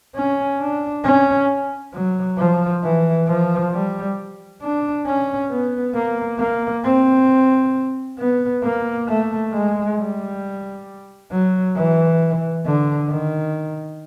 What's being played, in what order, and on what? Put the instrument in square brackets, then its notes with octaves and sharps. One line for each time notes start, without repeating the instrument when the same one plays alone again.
[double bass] C#4
D4
C#4
F#3
F3
E3
F3
G3
D4
C#4
B3
A#3
A#3
C4
B3
A#3
A3
G#3
G3
F#3
E3
D3
D#3